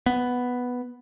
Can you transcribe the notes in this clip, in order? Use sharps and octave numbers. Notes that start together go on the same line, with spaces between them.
B3